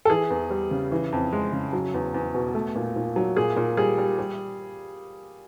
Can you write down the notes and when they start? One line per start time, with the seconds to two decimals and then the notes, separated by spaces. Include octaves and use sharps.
0.05 A4
0.10 E3 G#4
0.30 E2
0.50 G3
0.71 C#3
0.92 E3
1.12 F2
1.32 G#3
1.52 C#3
1.73 F#3
1.94 E2
2.14 E2
2.34 B2
2.55 A3
2.75 A#2
2.96 A#2
3.16 F#3
3.37 A#2 G#4
3.56 A#2
3.77 G3 G#4
3.98 G3
4.19 G3